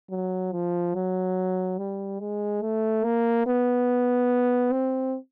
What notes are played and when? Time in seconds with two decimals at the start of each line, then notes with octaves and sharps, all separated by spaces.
0.10 F#3
0.53 F3
0.94 F#3
1.78 G3
2.20 G#3
2.62 A3
3.04 A#3
3.46 B3
4.72 C4